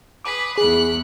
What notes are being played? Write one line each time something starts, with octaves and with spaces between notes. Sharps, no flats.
G#4 B4 D6 B6
E2 G#4 B5 F#6